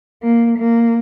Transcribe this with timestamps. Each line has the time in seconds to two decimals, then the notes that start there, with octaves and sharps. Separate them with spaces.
0.23 A#3
0.58 A#3